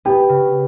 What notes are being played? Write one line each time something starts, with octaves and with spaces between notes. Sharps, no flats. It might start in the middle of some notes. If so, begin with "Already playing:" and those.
B3 G4
C#3